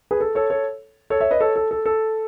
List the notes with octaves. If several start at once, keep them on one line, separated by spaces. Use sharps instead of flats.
G#4 B4
A4
A4 C#5
A4 C#5
A4 C#5
C#5 E5
B4 D#5
A4 C#5
A4
A4
A4